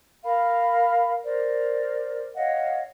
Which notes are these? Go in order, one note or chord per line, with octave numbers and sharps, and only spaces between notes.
A#4 F5 B5
A#4 C5 D5
C#5 D#5 F5 F#5